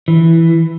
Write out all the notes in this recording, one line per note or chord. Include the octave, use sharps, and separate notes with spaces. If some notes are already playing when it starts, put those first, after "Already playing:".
E3